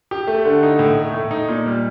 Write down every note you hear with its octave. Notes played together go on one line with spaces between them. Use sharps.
G4
A3
D3
D#4
A2
A3
A2
D#4
A#2
G3